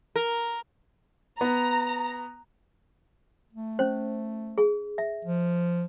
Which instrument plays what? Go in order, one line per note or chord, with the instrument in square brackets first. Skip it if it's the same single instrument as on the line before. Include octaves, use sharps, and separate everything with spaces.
[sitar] A#4
[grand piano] B3 [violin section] A#5
[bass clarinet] A3
[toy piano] C#4 C5
G#4
E5
[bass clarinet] F3